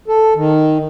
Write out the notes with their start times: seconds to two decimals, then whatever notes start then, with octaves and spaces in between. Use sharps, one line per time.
0.08 A4
0.36 D#3